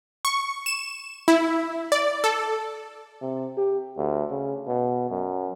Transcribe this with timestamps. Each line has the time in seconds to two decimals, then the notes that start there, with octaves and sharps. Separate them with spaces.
0.25 C#6
0.66 E7
1.28 E4
1.92 D5
2.24 A4
3.22 C3
3.57 G4
3.97 D2
4.31 C#3
4.67 B2
5.10 F#2